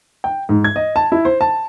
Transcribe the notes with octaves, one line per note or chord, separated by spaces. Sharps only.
G5
G#2
G#6
D#5
A5
E4
C5
A5